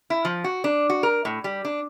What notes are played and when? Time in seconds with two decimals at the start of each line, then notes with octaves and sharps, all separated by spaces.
0.10 E4
0.25 F3
0.44 F#4
0.64 D4
0.89 F#4
1.03 A#4
1.25 A2
1.44 G3
1.65 D4